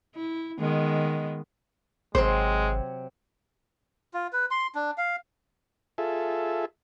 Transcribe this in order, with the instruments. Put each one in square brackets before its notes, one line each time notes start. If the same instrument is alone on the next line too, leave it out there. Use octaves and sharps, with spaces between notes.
[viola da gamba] E4
D#3 G#3 B3
[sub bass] G#1 [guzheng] C3 F#3 C4 [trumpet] G#3 [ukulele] C5
[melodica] F4
B4
C6
D4
F5
[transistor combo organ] F4 G#4 A4 E5